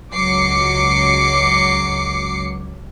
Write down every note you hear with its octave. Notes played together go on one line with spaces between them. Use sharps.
C#2 F#3 D6 C7 C#7